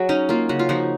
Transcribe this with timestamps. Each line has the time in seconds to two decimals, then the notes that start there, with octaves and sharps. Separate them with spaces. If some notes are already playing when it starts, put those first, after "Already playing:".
Already playing: F#3 F#4 G#4
0.09 C#4 D#4
0.29 A#3 F4
0.49 C#3 F#4
0.59 F4
0.69 F3 D#4 F#4